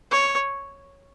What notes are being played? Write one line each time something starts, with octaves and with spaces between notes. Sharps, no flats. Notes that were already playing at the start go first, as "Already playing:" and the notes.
C#5